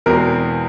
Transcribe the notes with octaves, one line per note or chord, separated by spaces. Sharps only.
E2 B2 G#3 C4 A#4